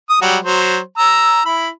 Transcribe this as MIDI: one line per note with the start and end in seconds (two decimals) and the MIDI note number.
0.10 0.20 87
0.22 0.37 54
0.22 0.37 55
0.22 0.37 66
0.45 0.78 54
0.45 0.78 72
0.98 1.42 82
0.98 1.42 88
1.45 1.68 64
1.45 1.68 83